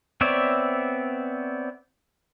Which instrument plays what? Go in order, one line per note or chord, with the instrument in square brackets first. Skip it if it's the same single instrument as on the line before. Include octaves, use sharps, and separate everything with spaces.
[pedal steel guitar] B3 C4 C#5 D5 E5